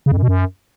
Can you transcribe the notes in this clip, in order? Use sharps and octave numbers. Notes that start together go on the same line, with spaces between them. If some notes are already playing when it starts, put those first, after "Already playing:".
C#3
F2
F#2
B2
F#2